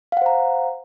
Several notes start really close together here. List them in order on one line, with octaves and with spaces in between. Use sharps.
F5 F#5 C5 A#5